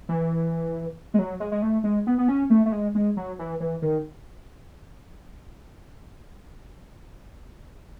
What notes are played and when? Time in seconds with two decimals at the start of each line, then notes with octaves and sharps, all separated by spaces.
0.09 E3
1.14 G#3
1.19 F#3
1.40 G#3
1.52 G#3
1.62 A3
1.84 G#3
2.07 B3
2.18 B3
2.28 C#4
2.50 A3
2.66 A3
2.72 G#3
2.95 G#3
3.17 F#3
3.39 E3
3.60 E3
3.82 D#3